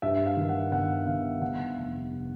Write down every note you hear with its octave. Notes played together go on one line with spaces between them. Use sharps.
G2 E5
F5
D#3
F#5
G1 F#5
G1 F5
D3 F#5
F1